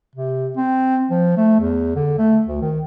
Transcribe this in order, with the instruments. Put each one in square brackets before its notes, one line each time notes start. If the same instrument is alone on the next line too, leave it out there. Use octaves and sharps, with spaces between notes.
[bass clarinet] C3
C4
F3
A3
E2
D3
A3
D2
D#3